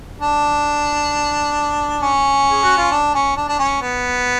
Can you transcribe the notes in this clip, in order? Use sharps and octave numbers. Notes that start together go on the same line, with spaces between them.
D4
C#4
G#4
F#4
F4
D4
C#4
D4
D4
C#4
B3